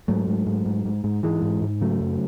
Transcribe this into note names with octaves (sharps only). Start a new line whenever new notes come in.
G#2 F#3 A3
G#2
G#2
G#2
G#2
G#2
G#2 E3 G#3
G#2
G#2
C#3 F#3 A3
F#2